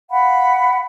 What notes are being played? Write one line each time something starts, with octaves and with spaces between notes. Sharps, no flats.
F5 F#5 B5